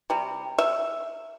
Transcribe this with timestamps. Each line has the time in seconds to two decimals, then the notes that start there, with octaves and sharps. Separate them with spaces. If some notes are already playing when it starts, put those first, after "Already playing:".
0.10 C3 G3
0.58 E5